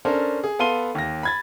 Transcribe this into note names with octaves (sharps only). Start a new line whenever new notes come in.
C#4 D4 A4 A#4 C5
G#4
B3 A4 F5 C6 D#7 G7
D#2 A#6
B5 G#6 A6